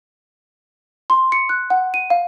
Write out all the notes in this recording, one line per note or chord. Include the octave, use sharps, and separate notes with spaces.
C6
C#7
F#6
F#5
D#7
F5